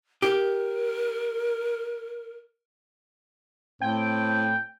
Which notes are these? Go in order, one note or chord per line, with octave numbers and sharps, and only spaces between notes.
G4 A#4
A2 C4 G5